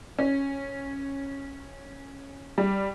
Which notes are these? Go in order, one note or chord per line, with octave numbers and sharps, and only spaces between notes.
C#4
G3